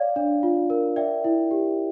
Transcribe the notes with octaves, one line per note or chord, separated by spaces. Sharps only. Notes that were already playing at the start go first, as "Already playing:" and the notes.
Already playing: C#5 D5 F5
D4
F4
A#4
D5 E5 G5
E4
G4